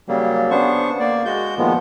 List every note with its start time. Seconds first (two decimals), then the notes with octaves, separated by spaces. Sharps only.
0.09 C#3 F#3 G3 A#3
0.51 C#3 B3 D4 C5 C#6
1.00 A#3 D5
1.25 G#3 F#4 G6
1.58 A#2 D#3 F3 G#3 B3